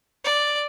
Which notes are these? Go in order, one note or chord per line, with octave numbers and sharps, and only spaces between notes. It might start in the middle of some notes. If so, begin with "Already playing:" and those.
D5